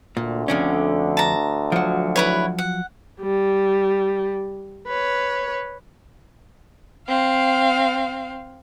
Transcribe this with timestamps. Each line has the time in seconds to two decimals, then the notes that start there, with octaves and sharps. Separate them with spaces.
0.17 D2 A#2
0.48 F2 D3 C#4
1.17 A5 A#5
1.72 F3 F#3
2.16 E4 B4 C#5
2.58 F#5
3.20 G3
4.88 B4 C#5
7.07 C4 F5